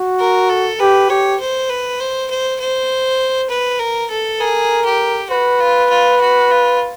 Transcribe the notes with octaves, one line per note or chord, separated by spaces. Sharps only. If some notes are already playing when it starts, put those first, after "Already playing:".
Already playing: F#4
A#4
A4
G4 B4
G4 C#5
C5
B4
C5
C5
C5
B4
A#4
A4
G#4 A#4
G4
F#4 B4
F4
F4
F#4
F4